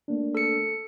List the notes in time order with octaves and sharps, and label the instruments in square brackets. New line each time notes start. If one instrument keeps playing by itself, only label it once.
[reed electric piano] A3 A#3 D4
[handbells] A4 C#7